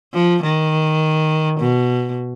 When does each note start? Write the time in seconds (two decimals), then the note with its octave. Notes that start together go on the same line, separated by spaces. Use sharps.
0.13 F3
0.43 D#3
1.60 B2